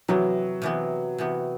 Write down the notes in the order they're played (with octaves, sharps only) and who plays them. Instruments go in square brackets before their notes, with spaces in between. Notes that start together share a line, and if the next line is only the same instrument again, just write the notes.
[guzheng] C3 E3 B3 [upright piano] F#3
[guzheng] C3 E3 B3
C3 E3 B3